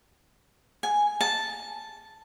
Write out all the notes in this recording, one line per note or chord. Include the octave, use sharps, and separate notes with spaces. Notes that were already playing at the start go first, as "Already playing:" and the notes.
G#5
A5